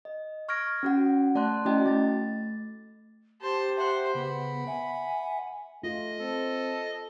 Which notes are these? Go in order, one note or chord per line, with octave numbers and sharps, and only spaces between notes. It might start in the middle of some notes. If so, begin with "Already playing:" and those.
D#5
C#6 F6 G#6 A#6 D7
C#4 F#4 F#5
A3 D5 A5 C6 F#6
A3 C#4 E4 F#4 D#5 G5
A3 A6
G4 C5 A5
C5 E5 F#5
C#3 B3 F#5 B5
E5 F#5 G#5
A3 F4 D#5
C4 A4